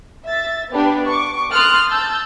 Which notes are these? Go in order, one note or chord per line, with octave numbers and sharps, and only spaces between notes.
E5 A6
B3 D4 G4 B4
C#6 D6
C6 D#6 F6 F#6 A6
A5 E6 G6 A6